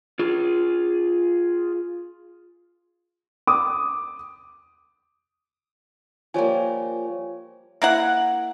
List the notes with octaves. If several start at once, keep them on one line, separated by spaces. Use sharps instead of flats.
F4 G#4
D6 D#6
F3 G3 A#3 C#5 G#5
A#3 E4 F#5